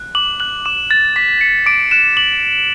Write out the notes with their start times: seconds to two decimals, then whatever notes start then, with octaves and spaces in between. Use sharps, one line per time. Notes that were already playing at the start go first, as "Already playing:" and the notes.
Already playing: F#6
0.15 D6 F#7
0.40 F#6 F#7
0.65 D6 E7
0.90 F#6 A6
1.16 D6 B6
1.41 F#6 C#7
1.66 D6 D7
1.91 F#6 E7
2.17 D6 F#7